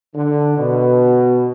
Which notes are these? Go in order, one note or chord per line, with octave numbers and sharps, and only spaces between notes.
D3
B2